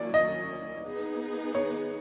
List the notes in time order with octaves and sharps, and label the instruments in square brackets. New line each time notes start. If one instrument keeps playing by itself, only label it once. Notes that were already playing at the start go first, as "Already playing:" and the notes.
Already playing: [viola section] F#3 A#3 C#4 E4 [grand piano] D5
[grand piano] D#5
[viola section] B3 D#4 G#4
[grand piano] C#5